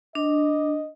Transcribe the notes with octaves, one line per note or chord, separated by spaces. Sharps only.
D4 D#5